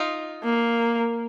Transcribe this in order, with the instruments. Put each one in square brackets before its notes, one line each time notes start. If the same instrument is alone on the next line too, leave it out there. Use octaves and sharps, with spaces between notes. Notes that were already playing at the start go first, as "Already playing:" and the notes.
Already playing: [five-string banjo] D#4 F4
[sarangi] A#3